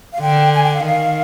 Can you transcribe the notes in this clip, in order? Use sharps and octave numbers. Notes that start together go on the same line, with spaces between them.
F5
D3 G5
G#5
G5
F5
D#3 F5